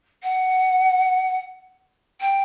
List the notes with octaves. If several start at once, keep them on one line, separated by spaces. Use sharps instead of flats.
F#5
G5